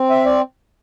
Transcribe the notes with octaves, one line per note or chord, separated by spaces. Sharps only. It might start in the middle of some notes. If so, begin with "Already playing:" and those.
Already playing: C4
E5
D5